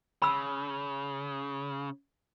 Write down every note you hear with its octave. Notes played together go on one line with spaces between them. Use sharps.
C#3 B5 E6